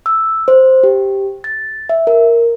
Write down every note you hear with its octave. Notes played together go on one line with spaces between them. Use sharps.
E6
C5
G4
A6
E5
A#4